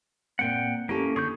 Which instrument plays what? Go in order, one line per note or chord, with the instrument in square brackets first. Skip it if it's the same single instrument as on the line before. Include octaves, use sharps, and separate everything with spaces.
[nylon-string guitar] A#2 A#3 C4 [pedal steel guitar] F#5 G5
[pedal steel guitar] A#3 C#4 [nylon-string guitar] E4 G4 A4
[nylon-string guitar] D3 [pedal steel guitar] G#4 C#6 G6